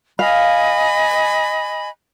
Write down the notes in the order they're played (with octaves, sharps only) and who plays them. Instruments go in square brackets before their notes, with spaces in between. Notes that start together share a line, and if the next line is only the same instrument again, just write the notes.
[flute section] D#5 G#5 B5 [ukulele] F5